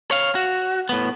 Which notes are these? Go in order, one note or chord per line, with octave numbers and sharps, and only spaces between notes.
C#5 F5
F#4
A2 B3